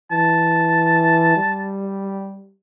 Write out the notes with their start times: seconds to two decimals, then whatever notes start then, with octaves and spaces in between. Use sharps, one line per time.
0.12 E3 A5
1.37 G3